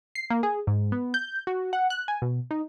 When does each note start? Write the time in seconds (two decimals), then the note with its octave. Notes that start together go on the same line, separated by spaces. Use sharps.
0.15 C7
0.30 A#3
0.43 G#4
0.67 G#2
0.92 B3
1.14 G6
1.47 F#4
1.73 F#5
1.90 F#6
2.08 G#5
2.22 B2
2.51 D#4